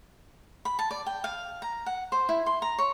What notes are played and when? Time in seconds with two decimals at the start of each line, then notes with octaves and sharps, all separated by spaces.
0.65 B5
0.79 A5
0.91 D5
1.06 G5
1.24 F5
1.62 A#5
1.86 F#5
2.12 C5
2.29 E4
2.46 C6
2.62 A#5
2.79 C#5